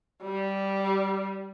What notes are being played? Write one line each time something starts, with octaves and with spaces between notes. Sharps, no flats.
G3